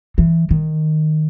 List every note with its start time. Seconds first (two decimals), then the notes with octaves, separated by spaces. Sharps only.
0.18 E3
0.51 D#3